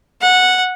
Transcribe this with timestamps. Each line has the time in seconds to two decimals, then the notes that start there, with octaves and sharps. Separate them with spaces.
0.22 F#5